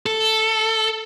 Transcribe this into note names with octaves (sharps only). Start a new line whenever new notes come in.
A4